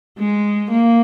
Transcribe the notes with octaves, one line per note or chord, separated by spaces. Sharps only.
G#3
A#3